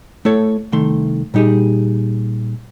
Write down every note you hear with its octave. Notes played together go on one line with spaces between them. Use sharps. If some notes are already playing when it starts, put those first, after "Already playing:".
A3 E4 A4 C#5
C2 D#3 A3 C6
A#2 G3 D#4 G4 G#4